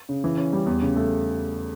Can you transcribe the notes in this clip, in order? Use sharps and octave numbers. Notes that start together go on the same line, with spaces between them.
C#3
E3
C#4
G3
E2
C#3
A3